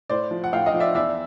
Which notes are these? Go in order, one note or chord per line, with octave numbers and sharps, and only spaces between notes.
A2 C5 D5
F3
F#5
A2 F5 G5
D#5 F5
F3
D5 E5
E2 D5 E5